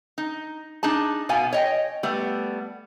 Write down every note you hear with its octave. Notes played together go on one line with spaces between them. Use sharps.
D#4
D4 D#4 G#4 A5
B2 B3 F5 G#5
C#5 D#5 G5
G3 A3 B3